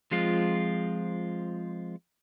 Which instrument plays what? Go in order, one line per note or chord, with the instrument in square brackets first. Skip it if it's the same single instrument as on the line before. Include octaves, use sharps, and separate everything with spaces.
[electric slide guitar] F3 G#3 C4 F4